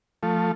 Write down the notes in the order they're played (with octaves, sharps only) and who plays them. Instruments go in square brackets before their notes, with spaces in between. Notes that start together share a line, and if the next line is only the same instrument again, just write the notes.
[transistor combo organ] F3 A3